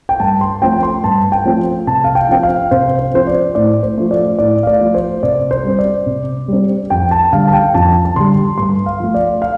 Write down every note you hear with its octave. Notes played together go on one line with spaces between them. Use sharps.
G5
G2 A5
C6
F3 A3 C4 G5
C6
G2 A5
G5
F3 A3 C4
C3 A5
F5
G5
F3 C4 G5
F5
C3 C5
C5
F3 C4 C5
D5
A2 D5
C5
F3 A3
D5
A2 D5
F5
D5
F3 A3
C5
C3 D5
C5
G3 C4
D5
C3
G3 C4
F2 G5
A5
D3 G3 F5
A5
G5
F2 A5
A5
D3 G3 C6
G2 C6
F5
F3 A3
D5
F5